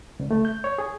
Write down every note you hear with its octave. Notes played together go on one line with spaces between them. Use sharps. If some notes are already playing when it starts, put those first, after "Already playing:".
C#2
A3
G6
C#5
G#4